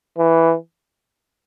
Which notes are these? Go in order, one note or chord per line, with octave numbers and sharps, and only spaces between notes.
E3